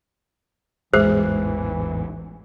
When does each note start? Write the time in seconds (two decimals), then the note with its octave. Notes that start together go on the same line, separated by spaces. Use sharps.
0.94 A1 E2 G#2 E3 G#3 G#4 C5